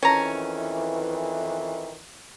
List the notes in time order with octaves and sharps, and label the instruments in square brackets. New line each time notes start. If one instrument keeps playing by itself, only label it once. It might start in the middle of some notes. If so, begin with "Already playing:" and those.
[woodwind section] F2 D#3 E3 [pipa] C#4 A#5